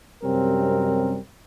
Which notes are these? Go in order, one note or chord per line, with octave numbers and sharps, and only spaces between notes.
F#2 C3 G3 C4 C#4 A#4